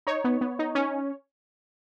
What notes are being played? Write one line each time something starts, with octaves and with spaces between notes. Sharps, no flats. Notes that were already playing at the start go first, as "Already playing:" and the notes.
D#4 C#5
B3
B3
D#4
C#4